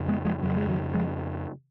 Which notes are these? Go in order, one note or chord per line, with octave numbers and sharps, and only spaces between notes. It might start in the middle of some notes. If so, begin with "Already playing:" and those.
Already playing: F2 C#3
G#3 B3
F3 G#3
F2 C#3 F#3
G#3
D#3 F#3
F3 G#3